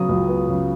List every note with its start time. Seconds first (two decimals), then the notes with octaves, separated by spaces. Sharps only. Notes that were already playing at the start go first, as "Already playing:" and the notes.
Already playing: C#3 F#3 B3 D#6
0.09 C#2
0.28 B3
0.49 C#3